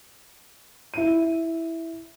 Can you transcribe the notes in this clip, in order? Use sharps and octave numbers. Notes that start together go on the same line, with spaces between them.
E4 D#7